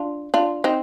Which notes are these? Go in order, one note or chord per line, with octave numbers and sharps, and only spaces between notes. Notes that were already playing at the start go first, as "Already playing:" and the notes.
Already playing: D4 F4
D4 F4
C4 D#4